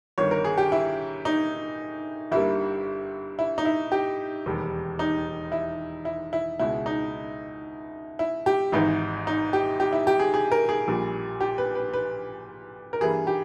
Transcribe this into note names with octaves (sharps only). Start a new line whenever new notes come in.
G1 G2 D#3 C#5
A#4
G#4
G4
E4
D#4
G1 G2 G3 A#3 E4
E4
D#4
E4
G4
E1 D#2 D#3 G3
D#4
E4
E4
E4
C#2 B2 G#3 E4
D#4
E4
G4
G#1 G#2 E3 D#4
D#4
G4
G4
E4
G4
G#4
G#4
A#4
G#4
A#1 A#2 G3
G4
B4
B4
B4
A#4
G2 E3 G3 A#3 G#4
G4